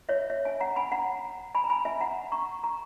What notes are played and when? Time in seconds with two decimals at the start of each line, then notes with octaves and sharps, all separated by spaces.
0.09 C#5 E5
0.30 C#5 E5
0.45 E5 G#5
0.60 F#5 A#5
0.76 G#5 B5
0.92 F#5 A#5
1.55 G#5 B5
1.64 A#5
1.70 G#5 B5
1.85 E5 G#5
2.01 F#5 A#5
2.32 A#5 C#6
2.63 A#5 C#6